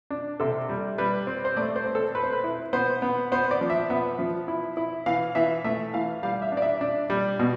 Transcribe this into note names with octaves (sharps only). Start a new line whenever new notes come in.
D4
C3 A4
G3
G3 B4
C4
C5
A3 D5
C5
C4
A4
C4 B4
C5
B4
E4
B3 C5
B3
B3 C5
D5
F3
E5
B3 E5
F3
E4
E4
E3 F5
E3 E5
A3 E5
E3 F5
G3 F5
E5
D4
D5
E5
D4
G3
B2